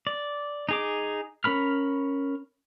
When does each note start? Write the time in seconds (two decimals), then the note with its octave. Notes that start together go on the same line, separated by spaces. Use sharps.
0.07 D5
0.69 D#4 G#4 D6
1.44 C#4 A#4 B5 F6